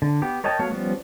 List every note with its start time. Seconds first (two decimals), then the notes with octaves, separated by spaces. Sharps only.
0.02 D3
0.22 B3 G4
0.44 A#4 C#5 D#5 G5 A5
0.59 F#3 A3 B3 C#5 F5
0.71 F3 G3 B3 C#4